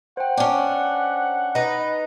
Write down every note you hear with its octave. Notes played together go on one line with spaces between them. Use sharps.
C5 F#5 G5
C#4 D4
D#4 B4